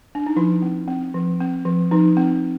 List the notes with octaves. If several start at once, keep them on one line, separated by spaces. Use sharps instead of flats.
D4
D#4
F3 E4
C4
C4
F3
C4
F3
F3 D#4
C4